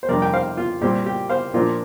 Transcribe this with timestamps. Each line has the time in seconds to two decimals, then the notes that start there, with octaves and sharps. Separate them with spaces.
0.03 C5
0.09 F2 C3 G3 D4 A#4 D5
0.22 G5
0.33 C5 F5
0.57 F4
0.82 A#2 G3 C4 G4
1.06 G4
1.29 C5 F5
1.54 A#2 F3 D4 F4 A#4